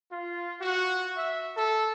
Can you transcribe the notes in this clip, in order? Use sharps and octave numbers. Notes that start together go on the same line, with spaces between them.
F4
F#4
E5
A4